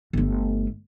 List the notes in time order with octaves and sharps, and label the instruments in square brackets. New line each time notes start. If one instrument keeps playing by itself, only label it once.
[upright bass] G1 A3